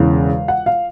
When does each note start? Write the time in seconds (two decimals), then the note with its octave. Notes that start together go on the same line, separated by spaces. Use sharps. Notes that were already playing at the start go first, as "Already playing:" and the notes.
Already playing: E1 E2 C#3 F5
0.48 F#5
0.66 F5